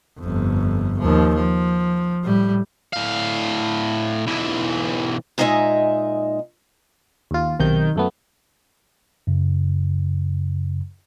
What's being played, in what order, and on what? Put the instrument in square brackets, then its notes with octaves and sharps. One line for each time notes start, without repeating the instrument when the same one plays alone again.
[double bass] G1 F2
D#2 F3
F3
A2 G3
[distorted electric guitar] A2 F5
B1 E3
[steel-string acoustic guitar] A#2 G#3 D#4 D#5 E5 G#5
[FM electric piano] D#2 F4
[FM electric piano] B1 C3 G6 [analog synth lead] D#3
[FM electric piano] F#2 A3 B3
[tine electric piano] F#2 C#3